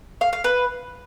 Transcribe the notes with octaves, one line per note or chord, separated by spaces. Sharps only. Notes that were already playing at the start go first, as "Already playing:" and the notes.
F5
F5
B4